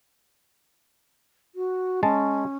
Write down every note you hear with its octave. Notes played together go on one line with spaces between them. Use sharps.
F#4
G#3 C#4 A5